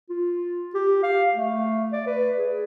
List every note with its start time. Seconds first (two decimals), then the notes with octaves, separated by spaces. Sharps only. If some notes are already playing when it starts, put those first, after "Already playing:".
0.10 F4
0.75 G4
1.03 F5
1.35 A3
1.93 D5
2.07 B4
2.38 G#4